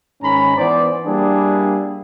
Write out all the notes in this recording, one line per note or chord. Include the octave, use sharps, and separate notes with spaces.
G#2 D#3 C#4 A#5 B5
E3 B3 C5 D5
G3 A#3 D4 E4 G#4